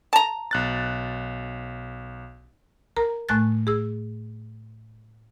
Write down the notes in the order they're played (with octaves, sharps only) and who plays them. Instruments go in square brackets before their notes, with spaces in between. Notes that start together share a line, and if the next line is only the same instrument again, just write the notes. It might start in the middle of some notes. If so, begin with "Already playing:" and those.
[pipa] A5 A#5
[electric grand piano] B1 F#6 A6
[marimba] A#4 A#5
A2 A3 G#5 F#6 A6
G#4 E6